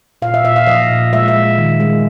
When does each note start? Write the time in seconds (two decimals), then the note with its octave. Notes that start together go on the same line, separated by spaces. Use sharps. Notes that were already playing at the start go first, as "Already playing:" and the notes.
0.22 A#2 F5
0.34 E5
0.44 A#2 E5
0.56 F5
0.67 F3 D#5
0.90 A#2
1.13 G#3 E5
1.28 E5
1.36 G#3
1.58 D#3
1.80 G#3